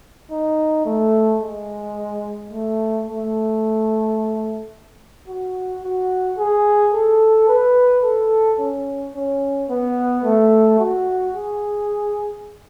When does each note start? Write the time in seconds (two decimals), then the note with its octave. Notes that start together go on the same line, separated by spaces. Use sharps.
0.31 D#4
0.86 A3
1.41 G#3
2.51 A3
3.07 A3
5.28 F#4
5.83 F#4
6.38 G#4
6.94 A4
7.48 B4
8.04 A4
8.59 C#4
9.14 C#4
9.70 B3
10.25 A3
10.80 F#4
11.35 G#4